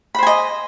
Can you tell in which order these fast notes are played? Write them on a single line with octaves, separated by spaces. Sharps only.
B5 C5 G#5 D#5